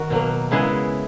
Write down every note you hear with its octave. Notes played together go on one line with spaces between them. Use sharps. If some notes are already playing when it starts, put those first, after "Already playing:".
Already playing: D#3 F#4 A#4
B2 F#3 A#3
C#3 G#3 B3 E4 G#4